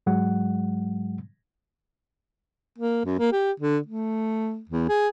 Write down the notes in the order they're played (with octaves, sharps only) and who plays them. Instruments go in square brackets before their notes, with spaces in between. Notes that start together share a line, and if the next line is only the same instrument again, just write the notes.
[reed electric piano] G#2 F#3 G#3 F#5
[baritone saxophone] A#3
F#2
A#3
G4
D3
A3
E2
G#4